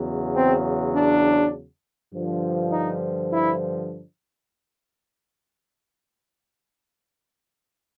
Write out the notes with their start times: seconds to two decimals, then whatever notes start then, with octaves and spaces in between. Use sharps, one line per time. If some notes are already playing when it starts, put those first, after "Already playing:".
Already playing: E2 C#3 F#3
0.36 C4
0.95 D4
2.13 G2 D3 F3
2.72 D#4
3.32 E4